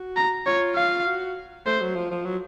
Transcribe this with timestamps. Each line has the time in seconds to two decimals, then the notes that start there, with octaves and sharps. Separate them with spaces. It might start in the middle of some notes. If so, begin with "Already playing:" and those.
Already playing: F#4
0.17 A#5
0.46 F4 C#5
0.76 F4 F5
1.06 F#4
1.66 A3 C5
1.81 F#3
1.95 F3
2.11 F3
2.25 F#3